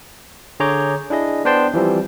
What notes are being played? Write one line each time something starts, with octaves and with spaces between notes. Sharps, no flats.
D3 G#4 C#5 A#5 D6 G6
D4 E4 G#4 D#5
B3 D4 C5 G5 A5 C6
E3 F3 G3 C4